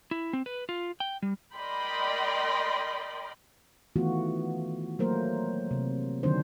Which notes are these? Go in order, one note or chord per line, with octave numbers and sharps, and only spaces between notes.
E4
C4
B4
F4
G5
G3
A#4 D5 D#5 G5 B5 C6
D#3 E3 A3 B3 F4 F#4
F#3 A3 A#3 A#4 C5
C3
D3 D#3 F#3 C4 D4 C5